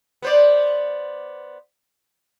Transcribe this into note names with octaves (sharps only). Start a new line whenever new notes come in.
B3 C5 D5